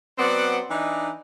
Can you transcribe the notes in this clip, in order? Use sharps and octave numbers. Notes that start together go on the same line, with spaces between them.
F#3 B3 C4 D5 F#5
E3 D4 D#4